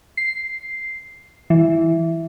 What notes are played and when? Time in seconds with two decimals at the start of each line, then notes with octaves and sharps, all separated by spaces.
0.17 C7
1.50 E3